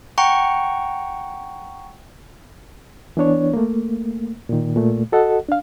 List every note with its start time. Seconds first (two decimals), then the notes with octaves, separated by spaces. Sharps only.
0.18 F#5 G5 A#5 C#6
3.17 E3 B3 D4 C#5
3.54 A3 A#3
4.49 A#2 D#3
4.76 A#2 A3
5.12 F#4 A4 D#5 F#5
5.48 D4 F5